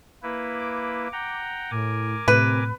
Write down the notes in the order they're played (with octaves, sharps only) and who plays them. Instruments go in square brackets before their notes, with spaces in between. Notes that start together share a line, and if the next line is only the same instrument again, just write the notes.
[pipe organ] A#3 E4 B4
[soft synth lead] D6
[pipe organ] F#5 G5 A#5
[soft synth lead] A2 [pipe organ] A#4 G#5 D6
[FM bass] A2 [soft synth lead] C3 [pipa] B4